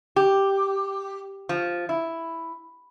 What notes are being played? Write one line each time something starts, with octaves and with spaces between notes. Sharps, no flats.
G4
F3
E4